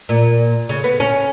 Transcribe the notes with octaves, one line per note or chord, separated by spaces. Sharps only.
A#2
C#3
B3
C#4